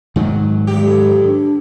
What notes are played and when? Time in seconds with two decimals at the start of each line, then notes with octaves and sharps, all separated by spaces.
0.16 G#2 D#3 F#3
0.67 E2 G#3 G4
0.86 A4
1.23 D4